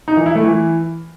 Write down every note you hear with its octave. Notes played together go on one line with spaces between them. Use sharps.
D#4
E3
E4
A3
E3